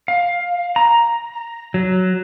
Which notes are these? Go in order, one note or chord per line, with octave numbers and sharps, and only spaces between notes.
F5
A#5
F#3